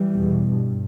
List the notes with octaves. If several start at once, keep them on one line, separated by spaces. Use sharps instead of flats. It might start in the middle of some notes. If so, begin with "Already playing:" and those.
Already playing: E3 G3
E2 B2
G2